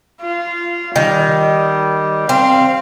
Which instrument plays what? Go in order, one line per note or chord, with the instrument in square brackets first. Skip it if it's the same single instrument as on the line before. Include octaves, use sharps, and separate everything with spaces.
[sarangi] F4
[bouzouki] D#3 [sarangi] G3
[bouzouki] C4 [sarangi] F5